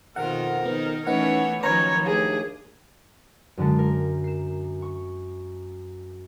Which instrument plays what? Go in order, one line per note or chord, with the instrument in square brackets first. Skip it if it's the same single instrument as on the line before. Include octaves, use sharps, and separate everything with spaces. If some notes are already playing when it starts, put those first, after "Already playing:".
[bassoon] F2 [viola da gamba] B2 D#3 F4 [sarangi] A#4 [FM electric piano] F#5
[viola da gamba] D#3 D#4 [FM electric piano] B3
[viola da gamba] E3 A3 C#5 [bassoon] B3 [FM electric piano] C#4 D#4 F#5
[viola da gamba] D#3 F3 F#3 [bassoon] C#4 [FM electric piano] B4 A#5 [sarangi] C#5
[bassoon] D#2 [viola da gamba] A3 D4 [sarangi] G#4
[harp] F#2 D3 G#3 A5
A#4
C7 E7
C#6